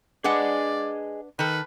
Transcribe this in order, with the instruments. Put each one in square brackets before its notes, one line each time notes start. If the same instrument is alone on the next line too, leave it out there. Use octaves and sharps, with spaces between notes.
[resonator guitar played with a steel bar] D4 B4 F#5 [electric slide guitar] G#4 D#5 G#5 [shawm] D5
[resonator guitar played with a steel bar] D#3 A4 [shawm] B4